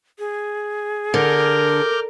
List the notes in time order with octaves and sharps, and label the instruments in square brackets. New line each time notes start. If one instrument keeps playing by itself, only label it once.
[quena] G#4
[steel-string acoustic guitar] D3 [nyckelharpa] A#4 [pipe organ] D6 F6 G6